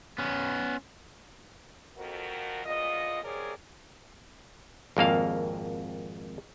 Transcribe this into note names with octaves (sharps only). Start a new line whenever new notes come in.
B3 C#4
F2 F#4 A#4
E2 A#2 F4 D#5
F#2 C3 G#4 A#4 C#5 D5
G#1 F2 A#3 F5